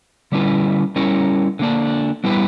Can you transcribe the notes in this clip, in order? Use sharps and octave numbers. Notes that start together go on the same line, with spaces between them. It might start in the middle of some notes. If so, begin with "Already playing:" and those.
D3 G3 C#4 E4 B4
G3 C#4 E4 A#4 C#5
D3 A#3 D4
G3 B3 E4 G4 B4